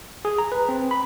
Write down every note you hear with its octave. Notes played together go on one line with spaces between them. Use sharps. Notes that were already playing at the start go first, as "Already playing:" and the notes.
G#4
A#5
B4
C4
B5